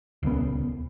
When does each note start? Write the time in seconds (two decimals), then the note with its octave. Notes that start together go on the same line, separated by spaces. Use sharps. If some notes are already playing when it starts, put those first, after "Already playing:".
0.23 D#1 C#2 C3 B3